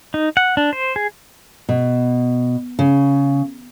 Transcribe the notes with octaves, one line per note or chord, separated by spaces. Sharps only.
D#4
F#5
D4
C5
G#4
B2
C#3